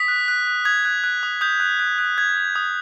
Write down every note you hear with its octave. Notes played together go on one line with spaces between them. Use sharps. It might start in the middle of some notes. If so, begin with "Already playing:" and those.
Already playing: D#6 B6
F#6
F#6
F#6
D#6 G#6
F#6
F#6
D#6
D#6 G6
F#6
F#6
F#6
D#6 G#6
D#6
D#6